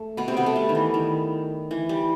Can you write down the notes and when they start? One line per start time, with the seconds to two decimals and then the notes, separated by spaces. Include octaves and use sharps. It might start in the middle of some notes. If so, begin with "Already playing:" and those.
Already playing: A3
0.17 B2 B3
0.28 C3 C4
0.37 B2 B3
0.46 A3
0.56 G3
0.69 D#3
0.75 E3
0.94 D#3
1.71 E3
1.89 G3